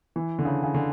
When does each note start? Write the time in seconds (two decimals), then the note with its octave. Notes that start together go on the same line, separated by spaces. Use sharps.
0.16 E3
0.39 D3
0.45 C#3
0.63 C#3
0.74 D3